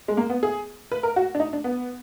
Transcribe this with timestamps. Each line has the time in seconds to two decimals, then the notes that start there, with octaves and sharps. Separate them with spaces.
0.08 G#3
0.17 A#3
0.30 B3
0.43 G#4
0.92 B4
1.03 A#4
1.16 F#4
1.35 D4
1.40 D#4
1.53 D4
1.64 B3